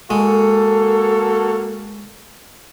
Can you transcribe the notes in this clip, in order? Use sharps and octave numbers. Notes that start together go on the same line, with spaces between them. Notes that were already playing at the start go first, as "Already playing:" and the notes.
G#3 A#3 F#4 A4